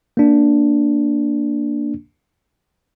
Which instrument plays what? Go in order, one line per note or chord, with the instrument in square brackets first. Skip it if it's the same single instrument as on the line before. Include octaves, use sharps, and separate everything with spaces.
[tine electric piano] A#3 D4